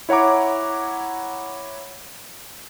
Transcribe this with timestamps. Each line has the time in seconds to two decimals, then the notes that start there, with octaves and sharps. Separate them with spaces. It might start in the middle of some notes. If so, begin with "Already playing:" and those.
0.09 E4 C#5 F#5 A#5 D6